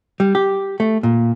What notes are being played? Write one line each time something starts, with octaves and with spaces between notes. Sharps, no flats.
G3
G4
A3
A#2